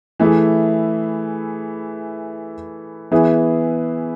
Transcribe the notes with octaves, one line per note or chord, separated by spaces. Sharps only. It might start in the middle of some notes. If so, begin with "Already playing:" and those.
E3 A3 E4 G#4
E3 B3 E4 G#4 B4